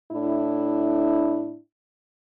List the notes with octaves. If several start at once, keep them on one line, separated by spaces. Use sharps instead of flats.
A2 D4 E4